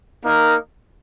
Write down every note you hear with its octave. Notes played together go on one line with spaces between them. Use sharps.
A#3 D#4 A#4